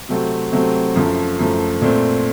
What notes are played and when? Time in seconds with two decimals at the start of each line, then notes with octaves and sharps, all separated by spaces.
0.09 C3 F#3 A3 C4
0.53 C3 F#3 A3 C4
0.96 F#2 F3 A3
1.39 F#2 F3 A3
1.81 A#2 A3 C4